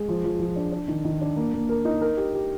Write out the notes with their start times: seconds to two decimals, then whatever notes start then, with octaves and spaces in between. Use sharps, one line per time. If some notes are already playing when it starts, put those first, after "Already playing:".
Already playing: G#3
0.08 F3
0.24 F3
0.40 F3
0.56 D4
0.72 D4
0.88 D#3
1.04 D#3
1.21 D4
1.36 A#3
1.53 A#3
1.69 A#4
1.85 D#4
2.01 A#4
2.17 G4
2.34 G4